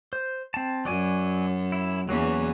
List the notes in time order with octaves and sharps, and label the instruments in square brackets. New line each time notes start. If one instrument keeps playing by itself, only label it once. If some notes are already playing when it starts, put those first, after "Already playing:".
[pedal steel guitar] C5
C4 A5
[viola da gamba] F#2 [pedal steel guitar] F#3 D5 G#5
[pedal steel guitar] E4
[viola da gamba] E2 E3 [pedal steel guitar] F#3 A#3 C#4